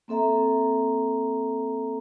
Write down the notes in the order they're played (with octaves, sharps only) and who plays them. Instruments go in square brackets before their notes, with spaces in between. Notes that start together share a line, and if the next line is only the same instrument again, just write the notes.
[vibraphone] A#3 C4 A4 E5 A#5